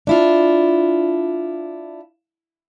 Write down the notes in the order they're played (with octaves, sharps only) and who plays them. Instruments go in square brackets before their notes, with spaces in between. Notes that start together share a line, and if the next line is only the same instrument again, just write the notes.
[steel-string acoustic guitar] D4 E4 F4